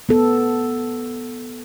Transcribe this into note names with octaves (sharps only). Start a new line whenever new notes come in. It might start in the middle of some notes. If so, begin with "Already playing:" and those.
B3 A4